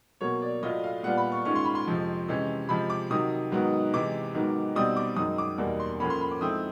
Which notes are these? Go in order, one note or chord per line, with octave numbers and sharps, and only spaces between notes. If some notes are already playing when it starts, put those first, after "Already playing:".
B2 F#3 A#3 C#5
D5
A2 F#3 A3 D4 F4 D#5
F5
A#2 G3 B3 D4 F4 F#5
B5
C#6
G#2 D#3 G#3 C#4 F4 C#6
C6
B5
C6
F2 C3 F3 G#3
C3 E3 G#3 C#4
C3 F3 G#3 B5
D6
C3 D#3 F#3 D#6
G#2 D#3 F#3 B3
C3 E3 G#3 D6
G#2 D#3 F#3 B3
B2 G3 C4 D#4 D#6
D6
F#2 D#3 G#3 D#6
D6
E2 B2 G3 A#3 D#4
C6
A2 F3 A#3 C#4 B5
C6
B5
D6
G#2 F3 A3 C4 E4 D#6